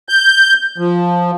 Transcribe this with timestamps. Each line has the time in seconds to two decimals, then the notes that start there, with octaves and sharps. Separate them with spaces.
0.09 G6
0.78 F3